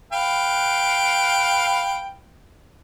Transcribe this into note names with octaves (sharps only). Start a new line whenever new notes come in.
B4 F5 G5